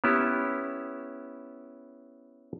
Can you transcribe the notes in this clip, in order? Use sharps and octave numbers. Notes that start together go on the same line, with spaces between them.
B3 C#4 E4 G4